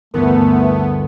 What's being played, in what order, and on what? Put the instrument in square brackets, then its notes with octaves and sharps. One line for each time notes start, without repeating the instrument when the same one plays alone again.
[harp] G1 D2 E3 [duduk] A3 [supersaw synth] B3 [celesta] A#4